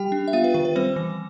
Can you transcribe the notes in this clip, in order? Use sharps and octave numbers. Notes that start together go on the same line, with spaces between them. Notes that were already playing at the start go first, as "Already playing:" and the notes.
Already playing: G3 G4 G5
D4
E5
B3 F4 F5
B4
D#3 B4
B4
G3 C4 C5
E3